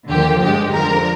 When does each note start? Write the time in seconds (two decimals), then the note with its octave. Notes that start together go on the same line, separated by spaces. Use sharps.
0.09 D#2 D3 F3 A#3 G4
0.42 G2 D3 G#3 G4
0.73 F2 D3 F3 A#4